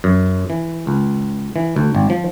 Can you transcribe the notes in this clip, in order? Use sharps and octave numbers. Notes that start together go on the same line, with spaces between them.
F#2
E3
C#2
E3
D2
G#1
F3